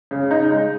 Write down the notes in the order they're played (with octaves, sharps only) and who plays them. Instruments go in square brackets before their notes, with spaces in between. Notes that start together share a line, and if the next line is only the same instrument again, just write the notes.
[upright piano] C#3
D#4
G#3